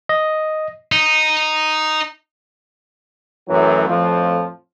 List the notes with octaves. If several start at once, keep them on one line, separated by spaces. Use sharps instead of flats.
D#5
D#4
F#2 A2 E3 F#3
F2 A2 F3